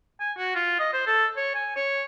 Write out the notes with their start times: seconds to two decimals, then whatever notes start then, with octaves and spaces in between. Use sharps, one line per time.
0.20 G#5
0.37 F#4
0.55 F4
0.79 D#5
0.93 C5
1.07 A4
1.37 C#5
1.55 G#5
1.76 C#5